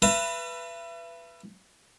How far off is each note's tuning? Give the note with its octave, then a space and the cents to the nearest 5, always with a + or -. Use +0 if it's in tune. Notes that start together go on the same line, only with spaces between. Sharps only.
B4 +0 E5 +40 A5 +45